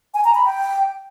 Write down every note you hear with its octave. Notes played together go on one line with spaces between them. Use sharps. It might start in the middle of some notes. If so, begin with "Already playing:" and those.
G#5
A#5
B5
G5